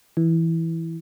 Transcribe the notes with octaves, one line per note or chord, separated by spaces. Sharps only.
E3